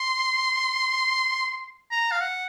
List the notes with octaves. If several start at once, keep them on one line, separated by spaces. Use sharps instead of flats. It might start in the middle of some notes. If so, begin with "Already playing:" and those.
Already playing: C6
A#5
F5
F#5